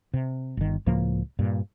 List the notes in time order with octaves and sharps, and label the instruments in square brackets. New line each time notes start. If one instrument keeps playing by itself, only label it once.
[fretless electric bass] C3
G1 D#3
C#2 A2 F3 A#3
G2 A#2